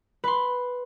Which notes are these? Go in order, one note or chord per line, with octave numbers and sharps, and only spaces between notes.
B4 C6